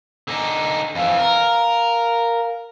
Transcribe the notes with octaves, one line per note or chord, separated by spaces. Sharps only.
D3 D#4 G#5
F2 E3 F5 G#5
A#4